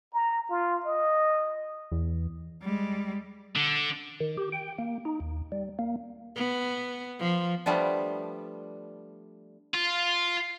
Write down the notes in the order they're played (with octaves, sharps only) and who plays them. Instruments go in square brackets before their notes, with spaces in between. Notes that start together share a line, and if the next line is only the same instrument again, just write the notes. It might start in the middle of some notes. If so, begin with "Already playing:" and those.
[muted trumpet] A#5
F4
D#5
[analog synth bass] E2
[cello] G3 G#3
[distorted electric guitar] D3
[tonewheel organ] D#3
G4
G5
A#3
D#4
D#2
G3
A#3
[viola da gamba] B3
F3
[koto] F3 G3 A3 B3 D4
[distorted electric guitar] F4